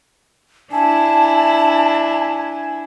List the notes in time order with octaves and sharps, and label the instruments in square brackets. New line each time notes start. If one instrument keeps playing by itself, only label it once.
[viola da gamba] D4 E4 [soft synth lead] G#5 [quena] A5